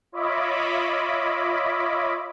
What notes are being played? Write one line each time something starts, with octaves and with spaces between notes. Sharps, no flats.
F4 C#5 D#5 E5 B5 D6